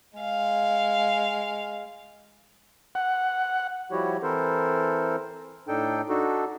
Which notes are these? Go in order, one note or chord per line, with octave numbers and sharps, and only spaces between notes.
G#3 F5
F#5
F3 G3 E4 F#4 G4 C#5
E3 C4 E4 A4 A#4 C5
A2 D4 D#4 A4 G5
D4 D#4 F#4 A4